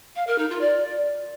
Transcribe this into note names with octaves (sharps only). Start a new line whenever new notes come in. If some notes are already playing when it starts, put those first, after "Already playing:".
F5
A#4
D#4
F4
D5